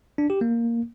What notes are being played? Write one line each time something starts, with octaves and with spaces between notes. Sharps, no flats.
D4
G4
A#3